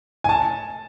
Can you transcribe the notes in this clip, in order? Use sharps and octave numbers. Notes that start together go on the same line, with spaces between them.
G#5
A5